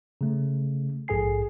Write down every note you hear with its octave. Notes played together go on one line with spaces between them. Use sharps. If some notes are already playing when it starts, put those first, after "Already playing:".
C#3 A3
A#1 G#2 G#4 A4 G#5 C7